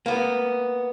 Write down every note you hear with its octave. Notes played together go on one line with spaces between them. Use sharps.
A#3 B3